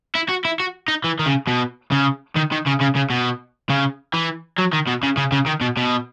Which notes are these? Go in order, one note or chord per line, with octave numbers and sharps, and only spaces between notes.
E4
F#4
E4
F#4
D#4
E3
D#3
C#3
B2
C#3
D#3
D#3
C#3
C#3
C#3
B2
C#3
E3
F#3
D#3
B2
C#3
C#3
C#3
D#3
B2
B2